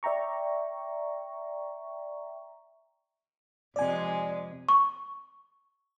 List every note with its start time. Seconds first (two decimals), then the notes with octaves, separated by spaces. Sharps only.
0.03 D5 E5 G5 A#5 C#6
3.76 F2 C3 G#3 D5 G#5
4.69 C#6